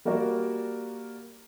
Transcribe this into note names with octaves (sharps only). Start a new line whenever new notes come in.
G3 A#3 F#4 A#4 D5